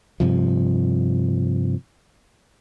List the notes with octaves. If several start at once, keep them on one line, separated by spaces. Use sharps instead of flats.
G2 C3 F3